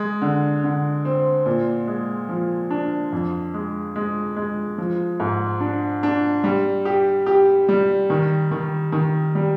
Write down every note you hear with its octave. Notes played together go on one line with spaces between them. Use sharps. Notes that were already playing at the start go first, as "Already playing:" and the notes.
Already playing: G#3
D3
D3
C4
A#2
G#3
F3
D4
F2
G#3
G#3
G#3
F3
G#2
D4
D4
G3
G4
G4
G3
D#3
D#3
D#3
G3